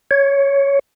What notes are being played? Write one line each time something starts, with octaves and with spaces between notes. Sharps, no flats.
C#5